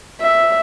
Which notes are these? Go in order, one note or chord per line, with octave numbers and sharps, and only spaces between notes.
E5